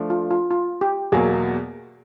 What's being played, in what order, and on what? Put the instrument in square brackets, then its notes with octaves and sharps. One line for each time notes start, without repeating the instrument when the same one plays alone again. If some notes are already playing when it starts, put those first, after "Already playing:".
Already playing: [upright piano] F3 A3 D4
[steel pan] F4
F4
F4
G4
[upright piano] E2 B2 F#3 A#3 [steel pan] G#4